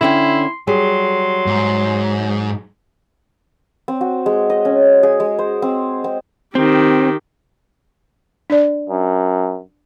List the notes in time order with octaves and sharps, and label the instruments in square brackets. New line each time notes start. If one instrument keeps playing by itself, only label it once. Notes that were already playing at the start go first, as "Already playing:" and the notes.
[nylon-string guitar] D3 C#4 G5 [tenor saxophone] E4 [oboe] C6
[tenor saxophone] F#3 [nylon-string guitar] G3 G#4 [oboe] C6
[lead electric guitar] G#2
[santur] C4
F#4
G#3
D#5
C#4
G#4
G#3
C5
C4
C4
[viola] D#3 G4 [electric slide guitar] C4
[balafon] D4 D5
[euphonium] F#2